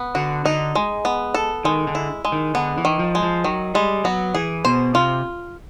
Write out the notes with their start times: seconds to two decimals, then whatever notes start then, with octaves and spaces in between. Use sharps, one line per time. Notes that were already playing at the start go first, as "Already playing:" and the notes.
Already playing: B3
0.15 D3 F#4
0.45 D3 D#4
0.75 G#3
1.05 B3
1.34 A4
1.64 D#3 G#3
1.87 D3
1.95 E4
2.25 G#3
2.32 D#3
2.55 D3 B3
2.78 E3
2.85 D#3
2.99 F3
3.15 G#3
3.23 F3
3.44 D#3 F#3
3.75 G3 G#3
4.04 F#3 B3
4.35 E3 G#4
4.65 B2 C5
4.94 C3 F4